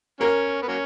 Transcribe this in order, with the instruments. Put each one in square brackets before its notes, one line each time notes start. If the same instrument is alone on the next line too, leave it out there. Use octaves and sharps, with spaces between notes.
[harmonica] F#3 A#3 C#4 [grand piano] A#4
[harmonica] B3
F#3 A#3 C#4